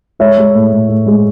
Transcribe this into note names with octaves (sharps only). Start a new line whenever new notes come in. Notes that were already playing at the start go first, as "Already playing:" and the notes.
G#3 C#5 E5
G#3
A2
A2
A2
G#3